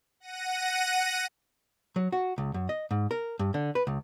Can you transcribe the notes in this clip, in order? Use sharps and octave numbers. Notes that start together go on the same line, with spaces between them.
F#5 A#6 D#7
F#3
F#4
C#2
F#2
D#5
G#2
A#4
G2
D3
B4
C#2